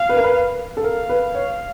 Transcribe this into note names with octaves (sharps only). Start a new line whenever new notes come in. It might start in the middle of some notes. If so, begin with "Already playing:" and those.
Already playing: F5
B4
A#4
B4
A4
A#4 F5
B4
C#5